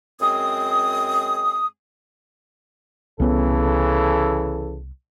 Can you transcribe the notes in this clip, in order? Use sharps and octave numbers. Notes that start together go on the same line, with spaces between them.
F#2 G#3 C4 D#6
C2 C#3 E3 B3 C#4 A4